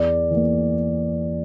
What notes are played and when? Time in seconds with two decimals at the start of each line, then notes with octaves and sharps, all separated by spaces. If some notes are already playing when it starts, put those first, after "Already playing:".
Already playing: E2 D5
0.31 E3 A#3